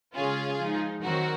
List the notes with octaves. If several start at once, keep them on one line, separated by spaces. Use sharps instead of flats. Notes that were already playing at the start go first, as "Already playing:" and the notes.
C#3 G#3 C#4 F4 G#4
F3 G#3 D#4
D#3 F#3 C4 F#4 A#4